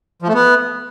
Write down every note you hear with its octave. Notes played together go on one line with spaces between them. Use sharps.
F3
A3
B3